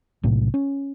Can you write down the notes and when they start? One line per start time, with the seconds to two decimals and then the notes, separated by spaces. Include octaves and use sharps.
0.23 B1 A2 C3
0.54 C#4